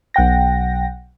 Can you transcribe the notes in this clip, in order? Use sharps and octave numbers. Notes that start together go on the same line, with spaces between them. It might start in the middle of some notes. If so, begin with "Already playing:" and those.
B1 F#5 G5 A#6